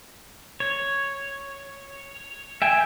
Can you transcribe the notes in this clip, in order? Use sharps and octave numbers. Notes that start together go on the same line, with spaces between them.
C#5
E5 G5 G#5